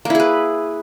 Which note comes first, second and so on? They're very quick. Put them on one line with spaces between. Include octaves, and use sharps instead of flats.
A#3 E4 G#4 B4